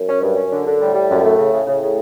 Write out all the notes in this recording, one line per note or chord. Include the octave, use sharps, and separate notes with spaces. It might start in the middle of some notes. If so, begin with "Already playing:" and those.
Already playing: F#2
C#4
G2
C#4
D3
D3
A2 G3
G3
F#2
A3
C#3
C#3
A2 C#3
C#3